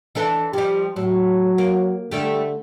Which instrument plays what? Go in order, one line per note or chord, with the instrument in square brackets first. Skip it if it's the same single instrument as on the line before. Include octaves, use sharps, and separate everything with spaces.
[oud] E3 D4 A4
[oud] F3 G3 [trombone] G4
[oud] A2 [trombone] F#3
[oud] A#3
[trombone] D3 [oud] G3 A3 G4